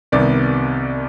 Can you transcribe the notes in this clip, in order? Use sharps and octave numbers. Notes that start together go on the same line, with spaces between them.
C2 C3 D#3 B3 D5